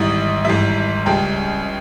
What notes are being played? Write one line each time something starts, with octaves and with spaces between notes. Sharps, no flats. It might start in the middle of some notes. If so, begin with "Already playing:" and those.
Already playing: G#1 G#2 E3 G3 E5
G#1 G#2 E3 G3 E5
C#2 C#3 G3 G5